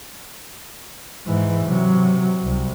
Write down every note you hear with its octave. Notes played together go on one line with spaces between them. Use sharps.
G#2 E3
C3 F#3
C2